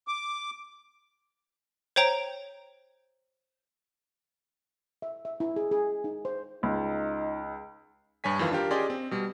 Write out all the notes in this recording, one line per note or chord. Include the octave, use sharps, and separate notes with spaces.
D6
C5 C#5 G5 A#5
E5
E5
E4
G#4
G#4
D#4
C5
C#2 D#4
G2 G3 C#5 G#5 B6
F2 D#3 E3 F4
D4 F4 G4 A#4
C#4 G4 G#4 D5 D#5 C6
C4
B2 G3